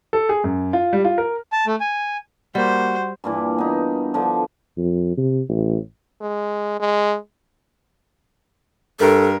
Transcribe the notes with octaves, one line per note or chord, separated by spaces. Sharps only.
A4
G#4
F#2
F4
G3
F4
A#4
A5
A3
G#5
G3 A#3 F#4 C5
G2 A#2 E3
B3 D#4
D3 F3
F2
C3
A1
G#3
G#3
G2 A4 A#4